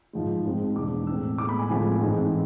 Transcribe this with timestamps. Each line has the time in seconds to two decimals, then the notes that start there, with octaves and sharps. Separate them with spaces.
0.13 G#2 F3 G#3
0.45 G#2 G#3 C4
0.76 E2 B2 G#3 D4 D6
1.07 A2 G#3 C4 E6
1.38 A2 G#3 B3 D6
1.49 B5
1.59 G#5
1.69 A2 F3 G#3 C4 G#5
2.01 G#2 E3 G#3 C4